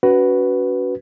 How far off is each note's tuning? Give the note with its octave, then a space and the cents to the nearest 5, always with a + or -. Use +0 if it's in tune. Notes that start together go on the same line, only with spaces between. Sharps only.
C#4 +35 F#4 +15 B4 +0